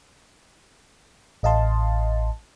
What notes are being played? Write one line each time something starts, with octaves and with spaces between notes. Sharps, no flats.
A1 D#5 F5 A5 C6